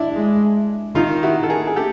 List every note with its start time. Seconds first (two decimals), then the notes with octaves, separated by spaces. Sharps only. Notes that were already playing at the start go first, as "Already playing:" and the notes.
Already playing: D4 E4
0.15 G#3
0.95 D#3 D#4 F4
1.23 E4 F#4
1.43 A4
1.49 G#4 A#4
1.67 G#4
1.76 G4 A4